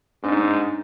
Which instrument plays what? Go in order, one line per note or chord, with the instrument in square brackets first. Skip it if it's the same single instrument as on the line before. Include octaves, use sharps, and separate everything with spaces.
[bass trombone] G#2 [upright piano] D4
[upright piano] D#4
D4